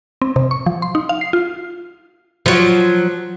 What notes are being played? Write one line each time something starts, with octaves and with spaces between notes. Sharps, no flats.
C4
C3
C#6
F3
C6
D#4
F5
C7
F4
F3 F#3